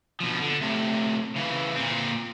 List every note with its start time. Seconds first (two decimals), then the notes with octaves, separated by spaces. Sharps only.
0.20 B2 F3
0.41 D3
0.61 A2 C3
1.36 C#3 E3
1.76 A#2 C4